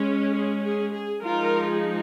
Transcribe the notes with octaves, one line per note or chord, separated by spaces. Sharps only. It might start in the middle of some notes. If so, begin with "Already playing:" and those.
Already playing: G#3 C#4
G#4
G#4
G#4
F3 G#3 D#4 F4 A#4
G#4